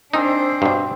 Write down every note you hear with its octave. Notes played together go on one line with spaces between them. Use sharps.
C4 D4 D#4 G#4 C5 D#5
G2 B2